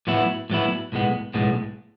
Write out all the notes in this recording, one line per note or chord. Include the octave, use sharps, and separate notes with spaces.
A2 F#3 B3 E4
A2 F#3 B3 E4
B1 A2 G#3 B3
B1 A2 G#3 B3